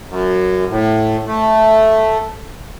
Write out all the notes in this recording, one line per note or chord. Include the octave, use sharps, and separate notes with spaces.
F#2
A2
A3